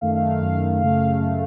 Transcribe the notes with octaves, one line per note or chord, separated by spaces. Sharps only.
F#2 D#3 A3 F5
F5
F5
F#2 D#3 A3
F#2 C#3 A3 F5
F#2 C#3 A3